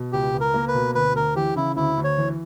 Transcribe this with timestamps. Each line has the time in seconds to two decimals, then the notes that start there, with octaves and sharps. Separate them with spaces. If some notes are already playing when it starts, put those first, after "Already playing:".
Already playing: B2
0.12 C#2 G4
0.34 C#2
0.41 A#4
0.54 A#3
0.68 B4
0.74 B2
0.95 D2 B4
1.15 D2 A#4
1.36 E3 G4
1.56 C#3 E4
1.76 D2 E4
1.97 D2
2.04 C#5
2.18 E3